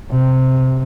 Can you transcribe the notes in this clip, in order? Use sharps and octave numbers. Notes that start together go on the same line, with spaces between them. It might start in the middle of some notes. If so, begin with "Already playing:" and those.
C3